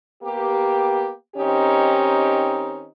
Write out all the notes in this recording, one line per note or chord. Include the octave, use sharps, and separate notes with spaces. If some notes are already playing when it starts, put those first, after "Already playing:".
A#3 B3 G4
D#3 C4 C#4 D#4 G4